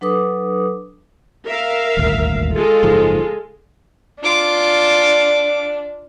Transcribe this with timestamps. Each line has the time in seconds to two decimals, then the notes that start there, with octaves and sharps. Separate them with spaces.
0.01 F#3 D4 A4 B4 D6 D#6
1.47 A#4 E5 F5
1.97 D#1 G#1 D2
2.54 G#3 F4 A4
2.83 F#1 G#2 F3
4.23 D4 F4 D6